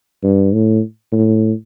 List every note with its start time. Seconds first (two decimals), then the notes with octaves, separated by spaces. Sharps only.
0.23 G2
0.53 A2
1.12 A2